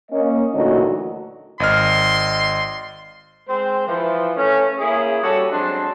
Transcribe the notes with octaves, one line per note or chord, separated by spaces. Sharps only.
A#3 C#4 D#5
D2 A#2 E3 F#3 D#4 D#5
G#1 D#5 C6 F6
G#3 C4 C5
E3 F3
A3 C#4
A#3 C#4 E4 G#4
G3 C#4 F#4 G4 A4
F#3 G#3 C4 D4